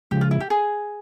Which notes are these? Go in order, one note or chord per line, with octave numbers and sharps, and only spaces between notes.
C#3 F3 G#3 G4
F4
E4
G4
G#4